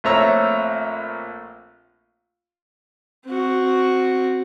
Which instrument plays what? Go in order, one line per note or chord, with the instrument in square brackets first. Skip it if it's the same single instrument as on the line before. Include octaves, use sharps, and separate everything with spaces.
[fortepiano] A#1 A3 C4 C#5 A#5 E6
[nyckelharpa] C4 F#4